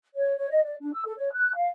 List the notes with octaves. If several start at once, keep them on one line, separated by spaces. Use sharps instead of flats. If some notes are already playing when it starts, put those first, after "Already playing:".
C#5
C#5
D#5
D5
D4
E6
A4
C#5
F#6
F5